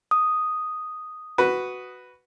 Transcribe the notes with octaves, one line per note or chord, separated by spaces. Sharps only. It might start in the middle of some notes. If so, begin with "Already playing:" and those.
D#6
F#4 B4